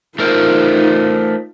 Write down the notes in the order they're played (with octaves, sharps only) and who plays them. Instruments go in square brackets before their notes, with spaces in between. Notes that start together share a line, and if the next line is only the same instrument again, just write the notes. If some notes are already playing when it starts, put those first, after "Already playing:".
[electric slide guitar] A3 A#4 C5 [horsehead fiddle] D#4 F4